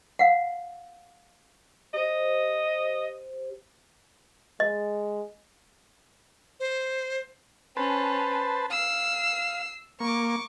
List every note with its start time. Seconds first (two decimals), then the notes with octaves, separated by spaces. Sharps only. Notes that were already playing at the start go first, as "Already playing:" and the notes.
0.19 F5 F#5
1.94 G4 C5 D#5
4.60 G#3 D#5
6.60 C5
7.77 C#4 B4 C5 A5
8.70 F5 E6 C7
10.00 A#3 C#6 D6